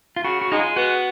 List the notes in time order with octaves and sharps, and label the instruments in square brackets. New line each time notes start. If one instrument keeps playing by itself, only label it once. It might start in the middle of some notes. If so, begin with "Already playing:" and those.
[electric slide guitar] F4
[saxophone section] C#3 [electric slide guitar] F#4
[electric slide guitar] F#4
[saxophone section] G#3 [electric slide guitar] D#4
[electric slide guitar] F4
[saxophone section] B3 [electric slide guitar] F#4